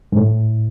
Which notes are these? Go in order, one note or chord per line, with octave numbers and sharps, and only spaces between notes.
G#2
A2